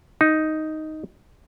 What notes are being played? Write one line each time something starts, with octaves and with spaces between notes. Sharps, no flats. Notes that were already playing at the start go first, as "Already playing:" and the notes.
D#4